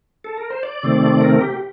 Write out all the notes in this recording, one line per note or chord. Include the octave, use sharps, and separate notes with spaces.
A4
A#4
C5
D5
C3 D#3 A3 C4
A#4
G4